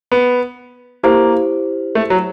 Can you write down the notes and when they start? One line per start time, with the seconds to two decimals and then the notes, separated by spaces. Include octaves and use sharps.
0.12 B3
1.03 A#3 E4 G4 C5
1.95 A3
2.10 F#3